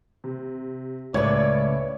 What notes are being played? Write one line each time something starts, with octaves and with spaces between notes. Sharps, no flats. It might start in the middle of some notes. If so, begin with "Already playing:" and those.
C3
C#2 A2 B4 C#5 D5 G#6